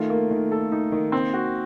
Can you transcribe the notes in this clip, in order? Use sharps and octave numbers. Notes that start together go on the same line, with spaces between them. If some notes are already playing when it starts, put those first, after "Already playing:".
Already playing: D#3 A3 F4
A#3
D#3
A4
D#4
D#3
A#3 C4
F#4